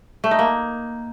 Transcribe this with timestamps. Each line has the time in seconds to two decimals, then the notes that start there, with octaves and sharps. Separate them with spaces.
0.24 A3
0.31 D#4
0.39 A#3